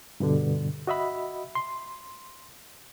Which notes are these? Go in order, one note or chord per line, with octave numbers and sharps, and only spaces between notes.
G2 B2 D3
F#4 D#5 E5 B5
C6